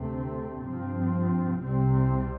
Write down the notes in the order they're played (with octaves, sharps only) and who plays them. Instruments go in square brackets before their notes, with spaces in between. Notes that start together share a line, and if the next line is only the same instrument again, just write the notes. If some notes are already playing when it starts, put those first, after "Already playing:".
Already playing: [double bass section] D2 C3 A3 C4
G2 F3 C4
C2 C3 G3 C4